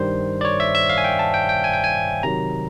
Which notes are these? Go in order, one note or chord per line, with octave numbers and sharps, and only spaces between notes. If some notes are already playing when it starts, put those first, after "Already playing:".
Already playing: G2 D#3 G3 C5
D5
C#5
E5
E5
F5
G#5
G5
A5
G5
G5
G#5
G5
G#5
C3 D#3 F#3 A#5